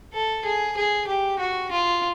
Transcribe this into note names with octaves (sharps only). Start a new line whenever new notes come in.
A4
G#4
G#4
G4
F#4
F4